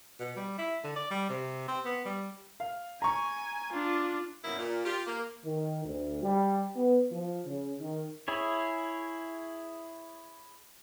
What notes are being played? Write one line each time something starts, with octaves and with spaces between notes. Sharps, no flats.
B2
G3
E4
D3
D5
G3
C3
C4
B3
G3
F5
G#5 A#5 C#6
D4 F4
F#2 B2 F#3 A#3 D#4 E4
A#2
F4 G4
A#3
D#3
D2
G3
B3
F3
C#3
D#3
E4 G#4 C#5